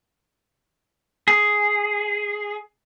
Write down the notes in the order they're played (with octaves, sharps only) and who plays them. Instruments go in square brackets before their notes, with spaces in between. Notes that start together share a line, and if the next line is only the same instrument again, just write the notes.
[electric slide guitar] G#4